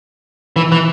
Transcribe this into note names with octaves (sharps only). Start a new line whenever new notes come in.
E3
E3